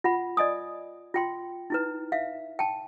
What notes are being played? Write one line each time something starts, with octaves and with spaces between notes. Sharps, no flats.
F4 F#5 B5
D5 D#5 G#5 D#6
F4 G5 C6
D#4 E4 B4
E5 F5
G5 A5